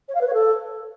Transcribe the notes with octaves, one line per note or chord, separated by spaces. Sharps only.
C#5
F5
B4
C#5
A4